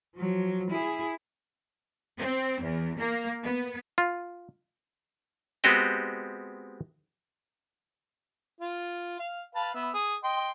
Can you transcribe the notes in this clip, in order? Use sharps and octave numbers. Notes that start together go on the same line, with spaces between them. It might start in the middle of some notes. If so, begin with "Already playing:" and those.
F3 F#3
E4 G#4
C4
E2
A#3
B3
F4
G#3 B3 C4 F#4 G4 D#5
F4
F5
B4 F5 A5
B3 E5
G#4 D#6
D#5 G5 C6